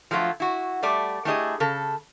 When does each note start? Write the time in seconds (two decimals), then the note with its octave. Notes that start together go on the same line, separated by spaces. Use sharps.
0.11 F3 F#3 A3 F4
0.40 E4 F#4
0.83 G3 A3 D5
1.25 A3 D4 E4 G4 G#4 D#5
1.60 C#3 A4